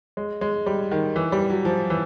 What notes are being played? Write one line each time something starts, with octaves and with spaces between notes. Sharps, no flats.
G#3
G#3
G3
D#3
E3
G3
F#3
F3
E3